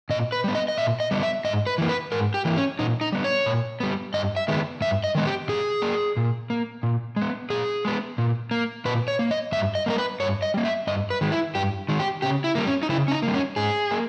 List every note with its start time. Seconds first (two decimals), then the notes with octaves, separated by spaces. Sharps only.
0.10 A#2 D#5
0.32 B4
0.44 G3 B3
0.55 D#5
0.68 D#5
0.78 A#2 E5
1.00 D#5
1.11 G3 B3
1.23 E5
1.44 G#2 D#5
1.67 B4
1.78 E3 A#3
1.89 B4
2.12 G#2 A#4
2.34 G4
2.45 E3 A#3
2.57 C#4
2.79 A#2 D#4
3.01 D#4
3.12 G3 B3
3.24 C#5
3.46 A#2
3.80 G3 B3
4.14 G2 D#5
4.36 E5
4.48 D#3 G#3 B3
4.81 G2 E5
5.04 D#5
5.15 D#3 G#3 B3
5.27 G4
5.48 A#2 G#4
5.82 A#3
6.17 A#2
6.50 A#3
6.83 A#2
7.16 G#3 B3
7.50 A#2 G#4
7.85 G#3 B3
8.18 A#2
8.51 A#3
8.85 A#2 B4
9.08 C#5
9.19 A#3
9.31 D#5
9.52 G2 E5
9.75 D#5
9.86 G3 A#3 A#4
9.98 B4
10.20 G2 C#5
10.42 D#5
10.54 G3 A#3
10.65 E5
10.87 G2 D#5
11.10 B4
11.21 D#3 G#3
11.32 E4
11.55 G2 G4
11.89 D#3 G#3
12.00 G4
12.22 C#3 G4
12.44 E4
12.55 G3 A#3
12.67 C#4
12.83 D#4
12.89 C#3 E4
13.08 C#4
13.11 D#4
13.23 G3 A#3
13.34 C#4
13.56 G#2 G#4
13.91 A#3